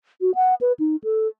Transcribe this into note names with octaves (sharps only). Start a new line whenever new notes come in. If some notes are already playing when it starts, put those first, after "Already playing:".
F#4
F#5
B4
D#4
A4